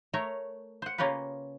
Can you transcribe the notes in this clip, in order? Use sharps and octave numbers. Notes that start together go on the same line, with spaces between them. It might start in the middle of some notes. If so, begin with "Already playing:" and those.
A3 A#4 C#5 A#5
C5 F#5
C#3 A#3 C#4 F4 G4 B4